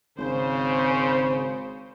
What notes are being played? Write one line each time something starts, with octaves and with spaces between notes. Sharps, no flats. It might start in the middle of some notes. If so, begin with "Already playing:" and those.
G#1 C#3 C5